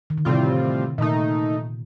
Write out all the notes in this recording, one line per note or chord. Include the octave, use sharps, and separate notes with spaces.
D#3
D3
A2 C3 G3 C4 F4
A#2 D#3 A3 D#4